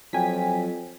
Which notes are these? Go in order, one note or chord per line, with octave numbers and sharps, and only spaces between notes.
F2 F3 F#3 G5 G#5 B6